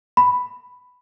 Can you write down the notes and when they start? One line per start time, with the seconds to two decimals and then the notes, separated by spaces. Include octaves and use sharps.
0.17 B5